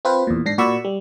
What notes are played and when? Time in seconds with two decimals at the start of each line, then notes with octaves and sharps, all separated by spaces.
0.05 C4 F4 B4 C5
0.27 E2 A#2
0.46 G#2 D4 A#6 C7
0.58 A#2 F#4 D5 B5 C#6 E6
0.85 G3